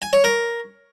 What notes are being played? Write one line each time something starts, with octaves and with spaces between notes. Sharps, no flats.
G#5
C#5
A#4